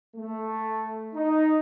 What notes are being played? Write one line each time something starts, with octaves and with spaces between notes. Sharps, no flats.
A3
D#4